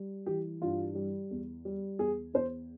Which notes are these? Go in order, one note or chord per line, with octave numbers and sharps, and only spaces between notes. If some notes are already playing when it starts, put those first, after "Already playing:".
Already playing: G3
E3 G4
G2 F4
G3
E2
G3
E2 G#4
E2 C5